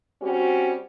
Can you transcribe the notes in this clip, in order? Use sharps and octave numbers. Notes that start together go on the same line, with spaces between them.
G3 C4 C#4 F#4